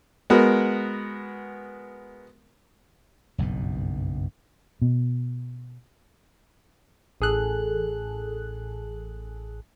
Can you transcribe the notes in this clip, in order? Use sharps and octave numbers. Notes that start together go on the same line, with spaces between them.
G#3 B3 F#4 A#4
F#1 B1 G2 B2
B2
A1 G#4 A4 F#6